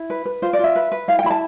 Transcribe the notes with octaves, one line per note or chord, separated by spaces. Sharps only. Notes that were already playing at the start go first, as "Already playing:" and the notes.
Already playing: E4
B4
B4
F4 C5
D5
F4 E5
B4
B4
E4 F5
G5
E4 B5
A5